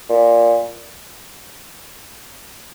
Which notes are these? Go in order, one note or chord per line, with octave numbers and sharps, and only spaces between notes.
A#2